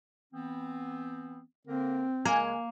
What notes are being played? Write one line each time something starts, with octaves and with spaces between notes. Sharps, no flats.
E3 B3 C4
D3 A#3 C4 A#4
C#2 C#3 G#3 A#3 G#5